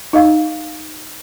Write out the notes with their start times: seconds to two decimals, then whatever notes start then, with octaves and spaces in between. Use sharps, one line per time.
0.13 D#4 D#5 F5